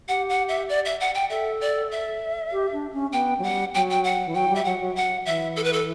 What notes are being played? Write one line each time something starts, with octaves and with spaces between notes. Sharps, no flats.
G4 F#5
F#5
E5
D5
E5
F#5
G5
A4 E5
D5
E5
G4
D4
C#4
B3 G5
F#3
G3 F#5
F#3 G5
G5
F#5
E3
F#3 G5
G3
E5
F#3 F#5
F#3
F#5
E3 E5
A4
B4
A4